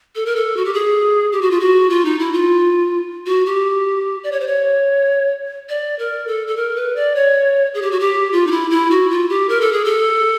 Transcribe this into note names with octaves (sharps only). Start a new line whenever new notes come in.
A4
A#4
A4
F#4
G4
G#4
G4
F#4
F4
F#4
F4
D#4
E4
F4
F#4
G4
D5
C#5
C5
C#5
D5
A#4
A4
A4
A#4
B4
D5
C#5
G#4
G4
F#4
G4
F4
D#4
E4
E4
F#4
F4
G4
A#4
A4
G#4
A4